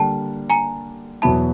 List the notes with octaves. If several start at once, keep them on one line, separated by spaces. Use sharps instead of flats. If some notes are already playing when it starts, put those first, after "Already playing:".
Already playing: D3 G3 A#3 D4 G5 A5
G#5 A#5
E2 B2 F#3 B3 E4 A5 B5